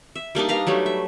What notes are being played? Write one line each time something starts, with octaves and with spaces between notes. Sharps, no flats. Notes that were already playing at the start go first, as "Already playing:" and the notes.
E5
G3 A#3 D4 D#4
B4 F5 A#5
F#3 G3 A3
E5